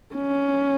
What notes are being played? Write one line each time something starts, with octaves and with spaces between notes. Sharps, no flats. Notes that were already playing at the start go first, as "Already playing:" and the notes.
C#4